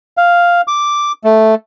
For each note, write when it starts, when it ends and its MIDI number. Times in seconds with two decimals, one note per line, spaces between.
0.17 0.61 77
0.68 1.12 86
1.24 1.55 57